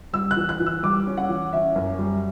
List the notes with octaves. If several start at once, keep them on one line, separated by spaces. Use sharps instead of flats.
G3 E6
F#6
E3
F#6
E3
E6
G3 D6
C#4
F#5
E3
C#4 E5
F#2
G3